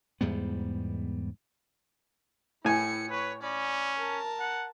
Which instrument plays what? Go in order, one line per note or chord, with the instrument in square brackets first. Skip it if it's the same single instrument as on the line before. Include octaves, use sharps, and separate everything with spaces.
[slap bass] E2 G#2 G3 B3
[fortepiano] A2 G#5 [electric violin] E4 C#7
[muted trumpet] B4 [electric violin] C#5 C#6
[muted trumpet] C#4 [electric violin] D5 B5
[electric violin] A#4 A5
[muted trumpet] F#5